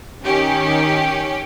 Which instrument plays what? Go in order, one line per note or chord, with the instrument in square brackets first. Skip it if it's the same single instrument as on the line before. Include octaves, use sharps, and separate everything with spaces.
[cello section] D#3 [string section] C#4 G4